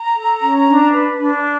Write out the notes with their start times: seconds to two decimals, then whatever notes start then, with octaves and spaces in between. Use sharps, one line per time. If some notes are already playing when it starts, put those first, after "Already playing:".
Already playing: A#5
0.14 A4
0.40 C#4
0.67 D4
0.93 B4
1.20 D4